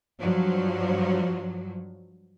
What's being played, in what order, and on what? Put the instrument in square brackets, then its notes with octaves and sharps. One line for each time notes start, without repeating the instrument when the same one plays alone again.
[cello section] G2 F3 F#3